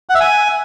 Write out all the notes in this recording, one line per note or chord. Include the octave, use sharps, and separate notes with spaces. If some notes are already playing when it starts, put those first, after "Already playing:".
F#5
E5
G#5